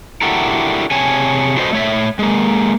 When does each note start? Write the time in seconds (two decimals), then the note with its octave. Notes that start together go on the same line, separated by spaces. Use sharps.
0.22 D4 E4 F#4 G4 A4 A#4
0.91 C3 G#4 C#5 G#5 A5
1.56 D4 F#4 A4 B4 C5 D#5
1.73 A3 C#5 E5
2.19 G#3 A#3